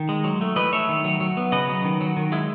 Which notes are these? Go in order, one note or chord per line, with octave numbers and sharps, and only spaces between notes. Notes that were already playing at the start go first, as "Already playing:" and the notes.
Already playing: D#3
G#3
F#3
A3
E3 B4 D#5
A3 C#5 E5
D#3
F#3
F#3
B3
C#3 B4 D#5
F#3
D#3
F#3
D#3
G#3 E4